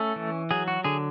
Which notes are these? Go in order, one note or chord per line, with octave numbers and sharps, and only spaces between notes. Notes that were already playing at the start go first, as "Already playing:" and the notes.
Already playing: A3 C#4 A4
E3
F#3 G#4
F#4
D3 G#4